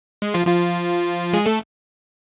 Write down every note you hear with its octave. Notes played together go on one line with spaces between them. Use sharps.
G#3
F3 F4
F3 F4
G#3 G#4
A3 A4